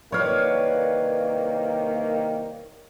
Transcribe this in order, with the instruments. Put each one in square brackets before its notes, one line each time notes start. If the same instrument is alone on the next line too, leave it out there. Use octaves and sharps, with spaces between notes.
[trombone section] C2 D#3 A#3 [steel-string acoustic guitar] B4 D5 [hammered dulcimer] C#5 F5